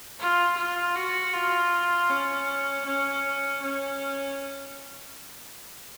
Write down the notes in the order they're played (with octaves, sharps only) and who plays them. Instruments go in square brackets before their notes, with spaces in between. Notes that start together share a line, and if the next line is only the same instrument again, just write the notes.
[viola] F4
F4
F#4
F4
C#4
C#4
C#4